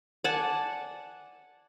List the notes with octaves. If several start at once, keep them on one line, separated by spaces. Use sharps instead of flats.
D5 F#5 G#5 A5